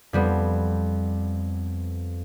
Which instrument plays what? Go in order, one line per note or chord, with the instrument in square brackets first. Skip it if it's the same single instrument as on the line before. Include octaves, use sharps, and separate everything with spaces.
[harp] F2 G3 B3